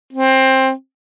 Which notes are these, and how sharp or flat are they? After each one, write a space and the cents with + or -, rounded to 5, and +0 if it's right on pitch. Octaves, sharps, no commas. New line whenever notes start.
C4 +15